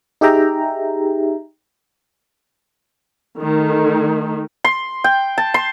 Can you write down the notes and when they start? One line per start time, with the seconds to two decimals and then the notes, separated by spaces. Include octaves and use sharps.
0.21 D#4 G4 G#4 E5 G5 A#5
3.39 D#3 A3
4.64 C6
5.04 G5
5.38 A5
5.54 C6